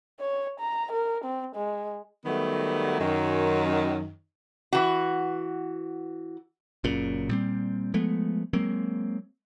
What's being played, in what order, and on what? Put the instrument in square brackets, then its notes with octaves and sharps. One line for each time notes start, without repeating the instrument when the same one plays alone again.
[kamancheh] C#5
A#5
A#4
C4
G#3
[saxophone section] D#3 F#3 G3 A3 B3
F#2 D#3
[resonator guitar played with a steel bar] E3 F#4
[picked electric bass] F#1 F#2 A#2 C#3
A#2 G3 C4
F3 G#3 A3 B3
F#3 G#3 A#3 C4